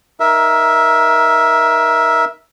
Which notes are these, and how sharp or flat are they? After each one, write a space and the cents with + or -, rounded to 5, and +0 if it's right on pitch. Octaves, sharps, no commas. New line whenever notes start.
D#4 +0 A#4 +20 E5 +0